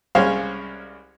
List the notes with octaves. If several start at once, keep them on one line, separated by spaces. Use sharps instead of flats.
C2 G#3 C#4 C5 C#5 F5